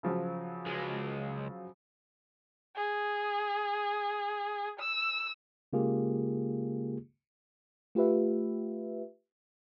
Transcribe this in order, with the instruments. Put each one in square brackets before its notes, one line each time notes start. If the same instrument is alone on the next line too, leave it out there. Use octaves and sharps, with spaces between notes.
[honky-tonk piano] C#3 F3 F#3
[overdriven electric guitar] C#2 G#3
[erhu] G#4
E6
[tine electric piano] C#3 G#3 A#3 F4 G4 G#4
[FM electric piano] A3 F4 G4 B4 E5